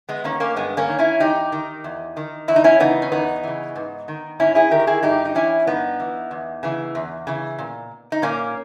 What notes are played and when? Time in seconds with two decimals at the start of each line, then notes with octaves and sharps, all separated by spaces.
0.09 G#3 B3
0.24 D#3 A#3 C#4
0.40 A#3 C#4
0.56 G2 G#3 B3
0.77 A#3 C#4
0.89 D#3
0.99 C#4 E4
1.20 E2 D#4 G4
1.52 D#3
1.84 E2
2.17 D#3
2.48 E2 E4
2.56 D#4
2.64 C#4 E4
2.80 C#3 E3 B3 D#4
3.02 C#4
3.12 E2 B3 D#4
3.43 C#3 E3
3.76 G#2
4.08 D#3
4.40 G#2 C#4 E4
4.55 E4 G#4
4.71 D#3 G4 A#4
4.87 E4 G#4
5.03 G2 D#4 G4
5.25 D#4
5.35 E3 C#4 E4
5.67 G2 B3 D#4
6.00 E3
6.31 E2
6.63 C#3 E3
6.95 E2
7.27 C#3 E3
7.58 A#2
8.12 D#4
8.22 A#2 A#3 C#4